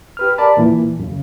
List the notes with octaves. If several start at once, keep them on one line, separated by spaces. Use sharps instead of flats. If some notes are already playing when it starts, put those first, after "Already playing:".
G4 B4 F6
A#4 D5 A5 B5
A#2 E3 A#3
F#2 C#3